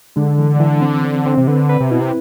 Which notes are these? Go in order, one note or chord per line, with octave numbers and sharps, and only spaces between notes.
D3 G#3
E3
E3
C4
C4
C4
C3
D3 B4
B4
C3
B2 E4
C3